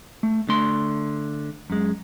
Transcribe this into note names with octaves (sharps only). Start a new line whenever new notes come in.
A3
D3 A3 C6
F#2 G#3